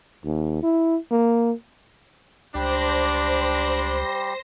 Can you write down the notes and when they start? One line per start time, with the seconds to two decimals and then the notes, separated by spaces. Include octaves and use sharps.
0.24 D#2
0.63 E4
1.11 A#3
2.55 C#2 G3 D4 G4 C5 C6 A#6